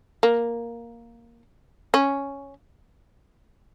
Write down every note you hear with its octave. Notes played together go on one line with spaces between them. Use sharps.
A#3
C#4